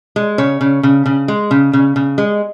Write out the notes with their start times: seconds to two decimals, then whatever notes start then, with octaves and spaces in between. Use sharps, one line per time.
0.16 G#3
0.38 C#3 C#5
0.61 C#3
0.83 C#3
1.06 C#3
1.28 G#3
1.51 C#3
1.73 C#3
1.96 C#3
2.18 G#3